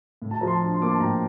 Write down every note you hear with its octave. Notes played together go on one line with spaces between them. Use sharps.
A2
A5
F3 A#5
A5 C6
D4
C6
A#3 D6
A5 C6
A2 G5 A#5